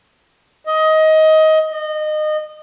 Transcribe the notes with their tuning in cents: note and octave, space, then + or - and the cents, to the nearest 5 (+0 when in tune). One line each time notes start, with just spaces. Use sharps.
D#5 +20
D#5 -25